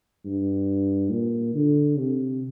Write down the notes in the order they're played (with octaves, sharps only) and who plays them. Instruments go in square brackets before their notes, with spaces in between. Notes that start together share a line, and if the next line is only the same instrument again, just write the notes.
[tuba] G2
A#2
D3
C3